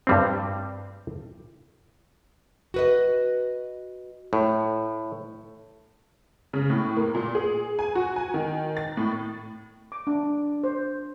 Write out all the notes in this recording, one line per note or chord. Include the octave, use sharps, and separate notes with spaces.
G2 G3 C4
F#4 B4 D#5
A2
C#3
A2
A#3
A#2
G#4
G#5
F#4
G#5
D#3
A6
A2
D6
D4
C5